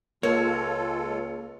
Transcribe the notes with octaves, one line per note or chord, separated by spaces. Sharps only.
C#2 G#3 A#3 F4 A4 C#5